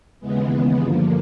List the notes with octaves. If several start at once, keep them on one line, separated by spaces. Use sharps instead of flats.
D#2 C#3 E3 G#3 B3
G2 D3 F3 A#3